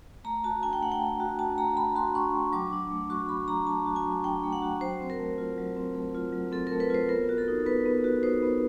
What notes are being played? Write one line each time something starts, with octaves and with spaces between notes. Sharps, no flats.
A3 A#5
F#4 A5
D4 G#5
G5
A3 F#5
G5
A3
F#4
D4 A5
A3 A#5
A3 B5
F#4 C6
D4 C#6
A3
F#3 D6
D4
A3
F#4 C#6
F#3 B5
D4 A#5
A3 A5
F#4
G#5
F#3
D4 G5
A3
F#5
F#4
F#3 C5
C4
A#4
A3
F4
F#3
C4
A3
F4
F#3
C4 A4
A3 A#4
B4
F4 C5
B3 A#4
F#4
A4
D#4
B3 B4
B3
F#4
D#4 C5
B3